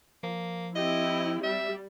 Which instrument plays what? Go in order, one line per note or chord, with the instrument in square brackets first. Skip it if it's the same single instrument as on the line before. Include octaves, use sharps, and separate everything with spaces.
[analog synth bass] F3 [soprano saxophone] A#3
[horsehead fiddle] C4 G4 [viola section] E4 [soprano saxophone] D#5
[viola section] G3 [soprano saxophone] E5